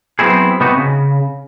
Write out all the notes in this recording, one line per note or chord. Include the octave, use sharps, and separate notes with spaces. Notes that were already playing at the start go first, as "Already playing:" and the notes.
F#3 B3 C4 E4 G#4
C3 B3 D#4 F#4
C#3